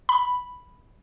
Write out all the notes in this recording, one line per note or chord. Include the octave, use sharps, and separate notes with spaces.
B5